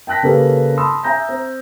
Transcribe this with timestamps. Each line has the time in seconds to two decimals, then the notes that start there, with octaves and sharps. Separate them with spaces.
0.07 G5 A5 F#6 A#6 B6
0.23 C#3 A#3 G4 A4 B4
0.77 A5 B5 C6 D#6 E6
1.03 E5 G#5 A#5 G6 A#6
1.29 C4